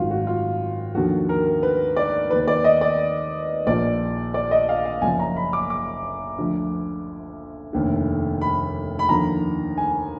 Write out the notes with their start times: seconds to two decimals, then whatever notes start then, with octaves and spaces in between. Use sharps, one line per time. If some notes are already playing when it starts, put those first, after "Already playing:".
Already playing: G#1 F#2 D#3 F4 F#4
0.11 F#4
0.27 F4
0.95 D#2 D3 F3 F#4
1.29 A#4
1.63 B4
1.96 D5
2.30 D#2 D#3 B4
2.48 D5
2.64 D#5
2.81 D5
3.66 A#1 A#2 F3 D5
4.34 D5
4.51 D#5
4.69 F5
4.85 F5
5.02 F#1 F#2 F3 G#5
5.20 A#5
5.36 B5
5.53 D6
5.70 D6
6.38 D2 D3 F3
7.73 F1 D#2 D3
8.41 B5
8.99 B5
9.09 D#2 D3 F3 A#5
9.77 G#5